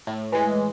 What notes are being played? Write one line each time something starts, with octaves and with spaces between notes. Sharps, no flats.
A2
E3 G#3